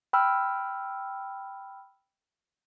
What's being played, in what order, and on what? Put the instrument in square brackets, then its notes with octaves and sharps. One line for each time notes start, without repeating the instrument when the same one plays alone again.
[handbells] G5 B5 E6 F6